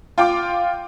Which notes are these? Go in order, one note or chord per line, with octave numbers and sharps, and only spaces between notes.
F4 G5 D6